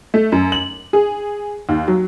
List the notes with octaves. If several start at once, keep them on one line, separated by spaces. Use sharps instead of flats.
A3
F#2
F#7
G#4
D#2
F#3